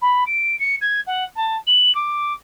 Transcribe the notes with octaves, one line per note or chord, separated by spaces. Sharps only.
B5
D7
C#7
G#6
F#5
A5
F#7
D6